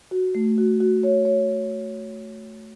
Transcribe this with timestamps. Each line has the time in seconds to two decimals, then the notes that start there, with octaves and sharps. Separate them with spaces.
0.11 F#4
0.35 A3
0.58 F#4
0.80 F#4
1.03 C#5
1.25 C#5